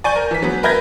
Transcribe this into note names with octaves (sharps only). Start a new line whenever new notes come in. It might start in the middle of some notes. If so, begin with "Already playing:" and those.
D5 G#5 C#6 G6
A#4
E3 B6
F#3 B3
A#4 B4 E5 G6 G#6 A#6